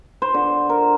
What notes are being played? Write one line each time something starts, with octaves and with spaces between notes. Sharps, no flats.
C5
D3
A#4